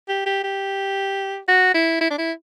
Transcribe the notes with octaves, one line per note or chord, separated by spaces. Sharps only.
G4
G4
G4
F#4
E4
E4
D4
E4